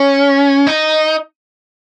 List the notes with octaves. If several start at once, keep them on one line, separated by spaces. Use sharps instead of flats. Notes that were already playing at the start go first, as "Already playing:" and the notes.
Already playing: C#4
D#4